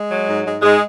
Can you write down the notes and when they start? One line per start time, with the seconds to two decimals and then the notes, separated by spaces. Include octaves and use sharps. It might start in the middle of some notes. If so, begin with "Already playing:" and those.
Already playing: G#3
0.11 F#3
0.28 G#2
0.45 G#2 G#3
0.62 G#2 G#3